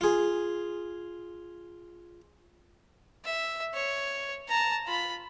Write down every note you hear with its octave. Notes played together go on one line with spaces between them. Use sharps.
F4 G#4
E5
C#5
A5 A#5
F4 B5